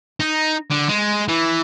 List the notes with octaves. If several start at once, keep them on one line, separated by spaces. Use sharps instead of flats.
D#4
D3
G#3
E3